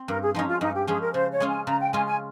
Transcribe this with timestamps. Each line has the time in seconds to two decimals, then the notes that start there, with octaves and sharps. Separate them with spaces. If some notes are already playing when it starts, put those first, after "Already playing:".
Already playing: C4
0.08 G2 A#4
0.21 G#4
0.35 F3 G#3 C#4 D#4
0.47 F4
0.61 G2 D#4
0.74 G4
0.87 F3 G#3 C#4 G#4
1.00 A#4
1.14 C#3 C5
1.32 C#5
1.40 G#3 C#4 F4
1.49 G#5
1.66 C#3 A#5
1.80 G5
1.93 G#3 C#4 F4 G#5
2.06 G#5